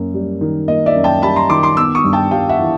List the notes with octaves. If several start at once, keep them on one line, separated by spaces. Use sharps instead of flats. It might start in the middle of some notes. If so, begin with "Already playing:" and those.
Already playing: F#2 A#3
G3
D#3
A#3 D#5
D5 E5
F#2
G5 A5
G3 A5 B5
A#5 C6
D#3 C6 D6
C6 D6
B3 D6 E6
C#6 D#6
G2
G5 A5
G3 F5 G5
E5 F#5
E3